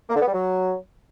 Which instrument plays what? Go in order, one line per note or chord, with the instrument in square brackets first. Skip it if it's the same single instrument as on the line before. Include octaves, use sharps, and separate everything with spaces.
[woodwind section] A#3
D3
B3
G3
F#3